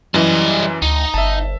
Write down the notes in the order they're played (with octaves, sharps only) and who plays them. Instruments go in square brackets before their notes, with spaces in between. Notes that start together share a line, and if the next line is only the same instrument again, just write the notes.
[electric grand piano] F#2 E3 [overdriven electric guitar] G3 D#5
[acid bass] D2 [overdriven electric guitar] D#4
[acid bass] G1 [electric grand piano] E5 A5